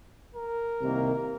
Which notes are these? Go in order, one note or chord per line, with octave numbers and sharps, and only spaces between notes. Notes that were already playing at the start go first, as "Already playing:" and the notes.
A#4
C2 C3 D#3 A#3